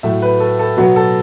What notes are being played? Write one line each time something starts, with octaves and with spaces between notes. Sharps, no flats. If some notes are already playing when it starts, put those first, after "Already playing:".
A2 F#3 A3 E5
B4
A4
A4
B2 F#3 B3 F#4
A4